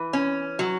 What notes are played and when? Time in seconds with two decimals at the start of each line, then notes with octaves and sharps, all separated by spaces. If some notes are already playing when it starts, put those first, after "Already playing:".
Already playing: E3
0.13 C#4
0.59 F#3